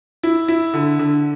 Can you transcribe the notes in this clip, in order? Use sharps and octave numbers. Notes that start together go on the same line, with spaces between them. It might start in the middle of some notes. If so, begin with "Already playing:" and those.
E4
E4
D3
D3